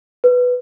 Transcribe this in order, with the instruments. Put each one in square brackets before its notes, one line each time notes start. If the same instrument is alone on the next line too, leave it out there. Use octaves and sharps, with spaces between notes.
[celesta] B4